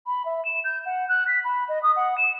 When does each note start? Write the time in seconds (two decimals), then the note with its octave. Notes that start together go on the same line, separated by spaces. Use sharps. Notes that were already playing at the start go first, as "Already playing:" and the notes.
0.07 B5
0.26 E5
0.45 E7
0.64 G6
0.86 F#5
1.09 F#6
1.28 B6
1.44 B5
1.69 D#5
1.83 D#6
1.96 F#5
2.18 E7